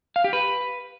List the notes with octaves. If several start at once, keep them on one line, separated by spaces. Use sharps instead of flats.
F5
G4
B4